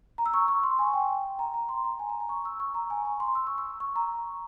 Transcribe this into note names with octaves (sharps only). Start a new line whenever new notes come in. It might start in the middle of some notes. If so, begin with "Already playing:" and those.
A#5
E6
C#6
C#6
C6
G#5
G5
A#5
A#5
C6
A#5
G#5
A#5
A#5
C#6
E6
C#6
A#5
G#5
A#5
C6
E6
C#6
E6
C#6
A#5